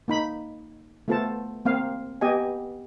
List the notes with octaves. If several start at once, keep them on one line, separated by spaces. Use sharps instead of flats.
A#3 D#4 B5
A3 B3 F4 A4 C5 A5
A#3 C4 F5
B3 G4 D#5 G#5